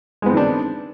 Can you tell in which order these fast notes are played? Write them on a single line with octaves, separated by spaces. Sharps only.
G#3 B3 C4 D#3 D4